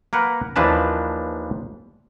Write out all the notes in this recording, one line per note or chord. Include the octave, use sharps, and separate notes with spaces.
A#3 A#4 B4 F#5
D#2 E3 F3 D4 B4 A5